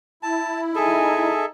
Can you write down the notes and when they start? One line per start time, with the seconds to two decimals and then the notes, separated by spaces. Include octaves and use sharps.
0.23 E4 A5
0.75 D#4 G#4 A4 E5 G#5